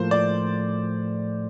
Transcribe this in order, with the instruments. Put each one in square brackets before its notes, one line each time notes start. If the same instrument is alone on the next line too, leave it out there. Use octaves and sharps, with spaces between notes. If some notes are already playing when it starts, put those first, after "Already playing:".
Already playing: [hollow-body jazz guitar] A2 F3 A#3 [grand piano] C5
[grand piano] D5